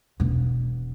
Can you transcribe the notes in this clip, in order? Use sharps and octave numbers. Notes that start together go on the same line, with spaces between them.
E1 B2